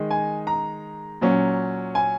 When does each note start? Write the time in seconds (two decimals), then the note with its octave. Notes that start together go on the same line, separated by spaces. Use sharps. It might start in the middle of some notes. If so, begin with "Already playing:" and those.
Already playing: D#3 G#3 D#4
0.11 G#5
0.47 A#5
1.21 A#2 F#3 C#4
1.95 G#5